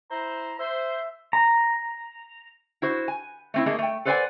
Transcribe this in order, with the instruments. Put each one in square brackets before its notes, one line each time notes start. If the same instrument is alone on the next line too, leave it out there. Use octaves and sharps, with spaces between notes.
[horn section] E4 C5 [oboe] A#5
[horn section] C5 [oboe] E5
[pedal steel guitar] A#5
[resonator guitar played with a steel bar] E4 F#4 C5
G#5
A3 C4 E4
A3 A#3 D#4 G#4 D#5
A3 G5
A4 B4 C5 D5 F#5 G#5